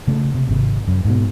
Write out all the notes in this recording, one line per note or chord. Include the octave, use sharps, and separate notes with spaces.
C#3 A3
C3
G#1 C3
F#2
G#2 B2